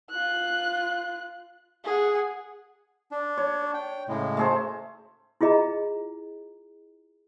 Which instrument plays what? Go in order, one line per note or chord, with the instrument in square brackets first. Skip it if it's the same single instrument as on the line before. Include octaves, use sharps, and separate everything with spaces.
[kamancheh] F4 F#6
G#4 F#5
[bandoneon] D4
[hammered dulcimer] C#5
[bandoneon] G5
A2 C#3 G#3
[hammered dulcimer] A3 G#4 C5
[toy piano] E4 F4 G#4 D#5 A#5